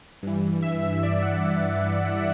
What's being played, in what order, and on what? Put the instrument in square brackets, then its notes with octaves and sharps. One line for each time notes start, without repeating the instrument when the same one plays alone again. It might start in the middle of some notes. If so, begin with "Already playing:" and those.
[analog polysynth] G2 E3
E5
E5
D5
F#5